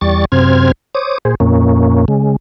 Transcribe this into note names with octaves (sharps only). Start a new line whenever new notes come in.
E2 G3 D5 C#6 A6
F#2 C3 C4 C5 F6 G#6
C5 C#5 D6 D#6
A#2 G#4 C5
F2 A#2 A#3 C#4
C#3 G#3